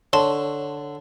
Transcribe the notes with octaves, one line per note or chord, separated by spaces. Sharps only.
D3 C#5 A5 C6